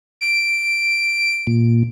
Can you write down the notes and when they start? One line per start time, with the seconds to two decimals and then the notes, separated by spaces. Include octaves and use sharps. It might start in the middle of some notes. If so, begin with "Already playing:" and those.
0.21 D7
1.47 A#2